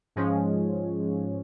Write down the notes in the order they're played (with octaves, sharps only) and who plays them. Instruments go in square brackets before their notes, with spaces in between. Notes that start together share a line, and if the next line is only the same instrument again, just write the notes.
[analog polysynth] G#2 F3 G#3 C#4